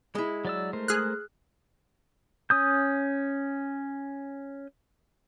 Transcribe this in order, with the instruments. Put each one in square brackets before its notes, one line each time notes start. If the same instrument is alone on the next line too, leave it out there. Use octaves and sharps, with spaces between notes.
[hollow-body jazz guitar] G#3 E4
[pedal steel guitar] F#3 D5 E6
A3 A#4 C5
[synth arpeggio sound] G#4 F6 F#6
[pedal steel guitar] C#4 D#6 G6